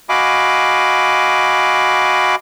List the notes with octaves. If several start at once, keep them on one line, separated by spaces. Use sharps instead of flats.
F#4 D#5 F5 G#5 B5 D6